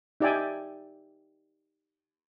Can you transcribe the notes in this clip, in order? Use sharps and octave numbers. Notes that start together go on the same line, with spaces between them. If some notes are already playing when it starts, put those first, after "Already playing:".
D#4 G4 D5 E5 G5 G#5